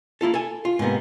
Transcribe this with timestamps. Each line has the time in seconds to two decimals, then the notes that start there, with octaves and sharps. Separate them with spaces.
0.21 A#3 E4 F4 A4
0.34 A4 G#5
0.65 F4
0.79 G#2 C3 A#3 B3